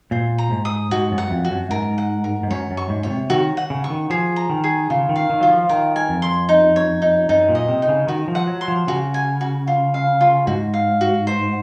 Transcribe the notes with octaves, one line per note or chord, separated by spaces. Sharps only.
A#2 C5
A#5
G#2
D#6
G#2 F#4
F#2
F#5
F2
F#4
F#2
G#2 A#4
F#5
A#4
G#2
F#2 C#5
F#2
C#6
G#2
A#2 C#5
C3
D#3 F#4
F#5
C#3
C#6
D#3
F3 G#4
A#5
D#3
G#4
C#3 F4
D#3
F5
D#3
F#3 F4
F3
D#3 A#4
G#5
F2
C6
D#4
C#5
D#4
F#2 D#4
A#2
D#5
C3
D#4
C#3
D#3 F#4
F3
F#5
F#3
C6
F3
C#3 F#4
G#5
F#4
F4
F5
F4
G#2 F#4
F5
F#4
C5